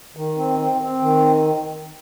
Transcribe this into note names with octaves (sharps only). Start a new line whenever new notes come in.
D#3
C4
C4
C4
D#3